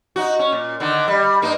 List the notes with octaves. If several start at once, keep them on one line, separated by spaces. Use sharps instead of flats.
D#4 F#4
C#4
A#2
D3 D#3
G3
G2 A#3 D#4